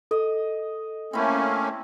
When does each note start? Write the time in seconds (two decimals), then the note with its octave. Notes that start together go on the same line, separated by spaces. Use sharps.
0.11 A4 D#5
1.13 A3 A#3 C4 C#4 E4